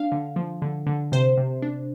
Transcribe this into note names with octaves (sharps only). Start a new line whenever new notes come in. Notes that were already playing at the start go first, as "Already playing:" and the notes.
Already playing: D4 F5
D3
F3
D3
D3
C3 C5
C3
D4